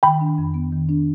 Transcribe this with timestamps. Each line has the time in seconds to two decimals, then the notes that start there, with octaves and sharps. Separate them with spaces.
0.03 D#3 G5 B5
0.21 D4
0.38 F2
0.54 B3
0.72 D#3
0.89 D4